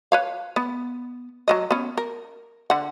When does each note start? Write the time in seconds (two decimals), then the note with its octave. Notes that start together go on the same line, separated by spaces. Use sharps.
0.12 B4 C#5 F5
0.56 B3
1.48 F#3 A3 D#5
1.71 B3 C#4
1.97 A#4
2.70 D3 F#5